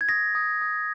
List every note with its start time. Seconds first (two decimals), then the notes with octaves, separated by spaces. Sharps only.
0.01 G#6
0.09 D#6 A#6
0.35 D#6
0.61 D#6